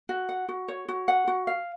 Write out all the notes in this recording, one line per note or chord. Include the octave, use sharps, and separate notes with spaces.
F#4
F#5
F#4
C#5
F#4
F#5
F#4
F5